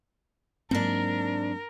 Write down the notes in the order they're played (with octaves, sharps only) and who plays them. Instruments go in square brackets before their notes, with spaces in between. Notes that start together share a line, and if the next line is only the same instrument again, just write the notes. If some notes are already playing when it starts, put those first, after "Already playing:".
[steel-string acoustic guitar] G#2 D4 [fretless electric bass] F#3 A#3 C4 [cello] A#4